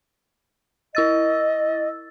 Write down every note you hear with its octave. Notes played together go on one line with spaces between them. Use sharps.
E4 D#5 E6 A6